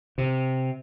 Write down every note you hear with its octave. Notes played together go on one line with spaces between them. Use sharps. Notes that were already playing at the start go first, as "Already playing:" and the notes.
C3